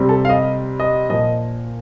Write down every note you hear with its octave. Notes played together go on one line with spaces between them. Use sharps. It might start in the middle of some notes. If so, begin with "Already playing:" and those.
Already playing: C3 G3 C4
A4
F5
D#5
D#5
A#2 F3 D#5